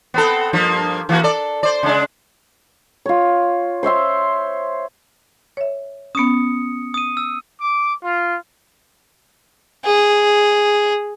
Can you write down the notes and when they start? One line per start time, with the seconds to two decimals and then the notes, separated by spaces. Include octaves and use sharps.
0.14 B3 C4 A4
0.53 G2 F3 A#3
1.09 E3 A#3 F#4
1.23 A4 D5
1.63 C5 D5
1.83 C#3 G#3 D4
3.06 F4 C#5
3.83 C5 C#5 E5 C6
5.57 C#5 E5
6.15 B3 C#4 D#6 C#7
6.94 D#6 D#7
7.17 E6
7.61 D6
8.04 F4
9.85 G#4